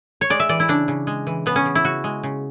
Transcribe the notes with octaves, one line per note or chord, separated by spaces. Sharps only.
C#5
G#3 D5
E5
E3 D5
E4
C#3 D4
C#3
G#3
E3
C#3 B3
C#4
C#3
E4
C#3 F#4
G#3
C#3